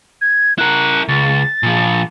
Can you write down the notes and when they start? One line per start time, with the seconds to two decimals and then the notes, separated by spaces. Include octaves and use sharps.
0.21 G#6
0.58 E4 A#4 F#6
1.08 C#2 A6
1.63 A#2 F3